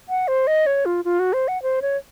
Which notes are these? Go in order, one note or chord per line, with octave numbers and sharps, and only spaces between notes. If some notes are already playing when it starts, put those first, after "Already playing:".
F#5
C5
D#5
C#5
F4
F4
F#4
C5
F#5
C5
C#5